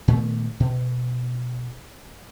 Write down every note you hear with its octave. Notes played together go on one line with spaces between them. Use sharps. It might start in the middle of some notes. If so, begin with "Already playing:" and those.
A#2 D#3 A3 B3
B2